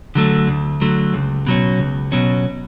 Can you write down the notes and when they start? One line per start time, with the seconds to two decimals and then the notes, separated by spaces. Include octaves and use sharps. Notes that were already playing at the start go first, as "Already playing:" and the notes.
0.15 D3 F#3 A3
0.48 D2
0.81 D3 F#3 A3
1.14 C#2
1.47 B2 F#3 C#4
1.79 C#2
2.12 B2 F#3 C#4